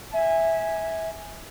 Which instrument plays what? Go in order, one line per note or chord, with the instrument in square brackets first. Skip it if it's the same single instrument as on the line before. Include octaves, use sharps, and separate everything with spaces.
[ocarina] E5 [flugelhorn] G#5